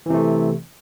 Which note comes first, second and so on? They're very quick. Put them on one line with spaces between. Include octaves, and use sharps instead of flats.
E3 C3 A3